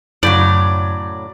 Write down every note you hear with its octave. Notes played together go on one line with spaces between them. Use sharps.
F#2 A2 C#3 F#3 D5